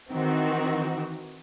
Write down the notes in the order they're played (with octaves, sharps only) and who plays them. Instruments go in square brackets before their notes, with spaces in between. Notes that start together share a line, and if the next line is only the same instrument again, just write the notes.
[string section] D#3 E3 C4 D#4 F#4